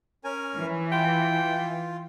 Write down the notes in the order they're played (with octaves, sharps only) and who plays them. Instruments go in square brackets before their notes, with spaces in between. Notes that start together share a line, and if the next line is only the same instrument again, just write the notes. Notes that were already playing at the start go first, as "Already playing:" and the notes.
[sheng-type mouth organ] C#4 A#4 G#5
[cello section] E3
[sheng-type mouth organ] F4 [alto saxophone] G5